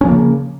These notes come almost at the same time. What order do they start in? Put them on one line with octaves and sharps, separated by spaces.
C#4 F3 A#3 C#3